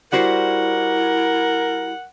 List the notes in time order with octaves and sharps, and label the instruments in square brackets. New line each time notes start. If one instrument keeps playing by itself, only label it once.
[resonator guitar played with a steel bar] G3 F#4 C5 [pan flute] E4 [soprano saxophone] A#4 [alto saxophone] F#5